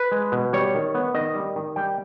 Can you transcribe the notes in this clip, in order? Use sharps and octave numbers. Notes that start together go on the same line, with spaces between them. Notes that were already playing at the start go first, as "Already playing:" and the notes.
Already playing: B4
G#3
B2
G3 C#5
D#3
B3
D#3 D#5
G3
D#3
G3 G5